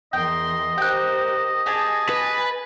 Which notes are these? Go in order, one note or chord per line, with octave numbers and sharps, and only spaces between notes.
E2 A#4 D#5 G5 C6
G4 A#4 C5 G5 F#6
G4 G#4 G#5 A5 A6
B4